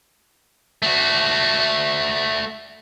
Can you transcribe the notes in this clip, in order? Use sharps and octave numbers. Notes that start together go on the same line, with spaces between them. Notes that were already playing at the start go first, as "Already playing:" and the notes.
A3 F#4